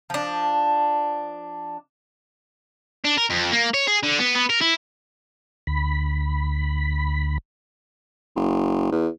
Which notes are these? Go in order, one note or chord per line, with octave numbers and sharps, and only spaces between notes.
F3 D4
D4
A#4
F2
A#3
C#5
G#4
D3
B3
B3
A#4
E4
D2 B5
F#1
E2